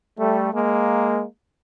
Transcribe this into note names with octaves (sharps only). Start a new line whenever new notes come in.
G3 A3
G#3 A#3